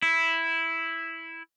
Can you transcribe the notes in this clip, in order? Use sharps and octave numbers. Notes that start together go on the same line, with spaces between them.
E4